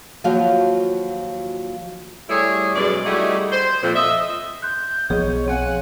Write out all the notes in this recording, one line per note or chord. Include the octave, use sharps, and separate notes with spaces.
D#2 F3 F#3 F4 F#4 F5
G3 A3 E4 G#4 C#5
F#2 B2 G#3 D5
G3 A3 D#4 E4 F#4 G#4
C5
F2 A#2
D#5 E5
C6 F#6 G6
B1 F3 B3 G#4 C#5 D#5
C4 G#4 C#5 F5 F#5 G#5